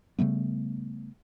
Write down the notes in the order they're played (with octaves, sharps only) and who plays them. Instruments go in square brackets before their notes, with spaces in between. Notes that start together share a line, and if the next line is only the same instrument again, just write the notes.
[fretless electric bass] C#3 G3 A3 B3